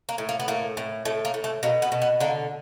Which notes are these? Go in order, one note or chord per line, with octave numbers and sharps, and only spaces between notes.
A#3
A2
A#3
B3
A2 A#3
A2
A2 A3
A#3
A2
A3
B2 A#3
B3
B2
B3
D3 A#3